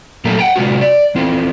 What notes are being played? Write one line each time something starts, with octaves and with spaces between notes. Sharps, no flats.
A#2 F#3 A3 A#3 A4 A#5
F#5 G5 A#5
C3 G#3 F4 F#4
D5
E3 C4 F4